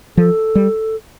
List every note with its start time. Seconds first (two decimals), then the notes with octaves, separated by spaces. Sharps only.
0.17 F3 A4
0.55 G3